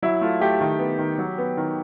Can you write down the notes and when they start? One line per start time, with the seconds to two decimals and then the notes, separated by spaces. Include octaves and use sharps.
0.02 F#3 E4
0.21 A3 F4
0.41 A3 G4
0.61 D#3
0.79 B3
0.99 D#3
1.18 F#3
1.38 B3
1.57 D#3